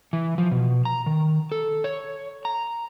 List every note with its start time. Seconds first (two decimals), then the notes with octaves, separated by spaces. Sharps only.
0.13 E3
0.38 F3
0.51 B2
0.85 A#5
1.06 D#3
1.52 A4
1.84 C#5
2.45 A#5